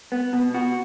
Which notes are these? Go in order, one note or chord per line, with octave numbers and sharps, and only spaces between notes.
B3
B2
F#4